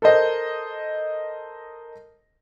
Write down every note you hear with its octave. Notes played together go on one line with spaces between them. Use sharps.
A4 A#4 C5 D#5